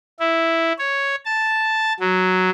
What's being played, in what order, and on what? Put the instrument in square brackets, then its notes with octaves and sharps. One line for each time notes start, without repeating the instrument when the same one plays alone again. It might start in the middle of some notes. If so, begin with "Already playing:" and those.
[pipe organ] E4
C#5
A5
F#3